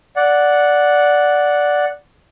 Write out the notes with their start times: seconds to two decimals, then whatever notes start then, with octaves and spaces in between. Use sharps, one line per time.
0.16 D5 F#5